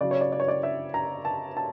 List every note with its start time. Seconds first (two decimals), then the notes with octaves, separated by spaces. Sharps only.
0.01 C#3 F#3 D5
0.11 C#5
0.21 D5
0.32 D5
0.40 C#5
0.48 D5
0.63 E5
0.94 A#5
1.25 A5
1.57 A5